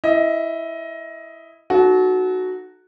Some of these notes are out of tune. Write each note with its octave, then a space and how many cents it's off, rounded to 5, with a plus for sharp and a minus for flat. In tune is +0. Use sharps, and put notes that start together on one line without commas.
E4 +0 D#5 +15
D#4 -20 F#4 +0 A4 -35